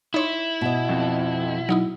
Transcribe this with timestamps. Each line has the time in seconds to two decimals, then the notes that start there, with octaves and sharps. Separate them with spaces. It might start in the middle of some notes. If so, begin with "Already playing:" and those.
0.14 D#4 E4 C#5 C6
0.61 B2 D#5
0.89 F2
1.69 F#3 D#4 E4